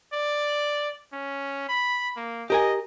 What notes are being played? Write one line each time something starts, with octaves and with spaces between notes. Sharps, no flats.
D5
C#4
B5
A#3
G4 A#4 D#5 G#5